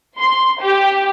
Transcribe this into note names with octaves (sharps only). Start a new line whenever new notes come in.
C6
G4